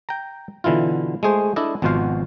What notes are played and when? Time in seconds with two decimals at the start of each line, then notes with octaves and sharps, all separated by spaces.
0.09 G5 A#5
0.64 B2 D3 E3 E4 F4
1.23 G#3 A3 G#4 C5
1.56 D4 E4 A4 D5 D#5
1.82 G#1 B2 F3 F#4 C5 F5